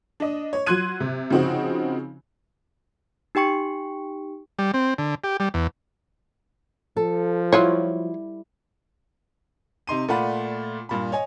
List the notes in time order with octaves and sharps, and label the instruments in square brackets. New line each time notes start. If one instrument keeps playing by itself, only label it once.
[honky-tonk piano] D4 D#5
C#5
F#3 F4 C6 F#6 G#6 D#7
C3
C#3 F3 C4 D#4 F#4
[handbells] D#4 G4 G5 C#6 C#7
[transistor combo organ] G3
C4
D3
G4
G3
E2
[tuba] F3 [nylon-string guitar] A4
[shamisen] F#3 F4 C#5 [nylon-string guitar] G3 E4
[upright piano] C3 D#4 C6 D#7
A#2 A3 F4 D5 F#5 B5
G2 A#2 B5
C#5 D#5 G#5